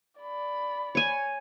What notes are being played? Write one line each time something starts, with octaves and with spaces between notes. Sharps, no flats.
D5 B5
C#5 G#5